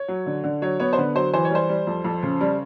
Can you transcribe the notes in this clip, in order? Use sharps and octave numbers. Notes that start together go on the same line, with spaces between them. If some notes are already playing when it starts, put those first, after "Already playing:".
Already playing: C#5
F#3
D3
D3
F#3 C#5
B3 C#5
C5
D3 B4
F#3 C5
E3 C5
C#5
G3 C5
G3
F2
F2
C#3
G3